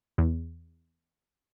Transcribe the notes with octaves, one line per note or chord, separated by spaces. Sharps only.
E2